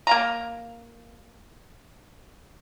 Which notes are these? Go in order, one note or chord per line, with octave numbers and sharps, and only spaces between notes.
A#3 F5 A#5